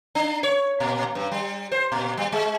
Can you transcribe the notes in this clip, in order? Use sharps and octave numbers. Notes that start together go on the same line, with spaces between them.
D4
C#5
A#2
G2
G3
C5
A#2
G3
G#3